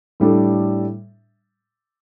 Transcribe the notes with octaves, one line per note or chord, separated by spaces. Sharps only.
A2 G3 D4 A4